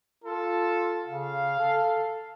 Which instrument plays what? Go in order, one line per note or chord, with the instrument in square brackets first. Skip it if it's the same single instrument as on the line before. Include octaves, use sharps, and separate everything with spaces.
[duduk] F4 [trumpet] A4
[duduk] C#3 [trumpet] F5
[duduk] A4